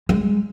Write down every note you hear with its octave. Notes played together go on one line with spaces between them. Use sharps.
G#3